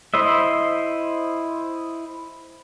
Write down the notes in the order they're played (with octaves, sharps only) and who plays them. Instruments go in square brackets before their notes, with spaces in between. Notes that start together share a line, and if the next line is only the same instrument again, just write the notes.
[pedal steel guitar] E4 C5 D#5 E5